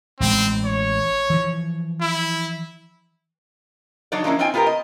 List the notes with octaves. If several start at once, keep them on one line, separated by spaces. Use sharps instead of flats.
A1 G#3 C4
C#5
E3 F3
E4
F#3 D4 D#4 F#4 C#5 D5
F3 G#3 A#3 C#4 E4
C4 D#4 F4 G5 G#5
B3 F4 G4 A4 A#4
D#5